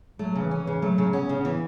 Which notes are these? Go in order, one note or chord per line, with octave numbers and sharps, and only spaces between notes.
F#3 A3
C#3 E3
C#4
E3
C#3
F#3 A3
C#3
B3 C#4
C#3
C#4
E3 B3